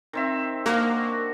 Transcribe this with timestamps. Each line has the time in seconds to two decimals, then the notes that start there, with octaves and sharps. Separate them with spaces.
0.13 D#3 C4 E5
0.66 A#3 D4 F#4 A#4